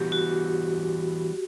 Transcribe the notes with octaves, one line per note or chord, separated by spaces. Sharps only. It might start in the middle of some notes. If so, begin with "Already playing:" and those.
Already playing: E3 G3 B3 F#4 G4
F#4